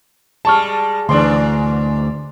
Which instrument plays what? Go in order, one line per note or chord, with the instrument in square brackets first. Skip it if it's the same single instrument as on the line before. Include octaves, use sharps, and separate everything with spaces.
[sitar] G3 G#3 [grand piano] A5 C#6 F6
[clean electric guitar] D2 [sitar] G#2 E3 D4 [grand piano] D5 C6